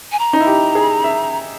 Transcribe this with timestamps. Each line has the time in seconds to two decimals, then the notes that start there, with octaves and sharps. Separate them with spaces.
0.12 G#5
0.19 A#5
0.33 D#4
0.40 E4
0.47 G4
0.75 G#4
1.04 E5